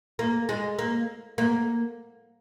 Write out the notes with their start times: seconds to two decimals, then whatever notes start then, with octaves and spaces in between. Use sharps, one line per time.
0.19 A#3
0.49 G#3
0.79 A#3
1.38 A#3